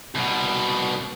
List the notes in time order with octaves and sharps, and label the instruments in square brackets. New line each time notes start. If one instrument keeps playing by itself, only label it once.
[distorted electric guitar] C2 B2